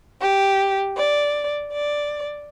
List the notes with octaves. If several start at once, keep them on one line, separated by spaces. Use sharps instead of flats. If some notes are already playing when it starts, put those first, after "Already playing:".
G4
D5
D5